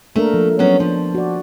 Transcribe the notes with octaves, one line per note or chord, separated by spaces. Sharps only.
A3 A#3 D4 A#4
F3
F#3 B3 C#4
F3 D4
F#4 D5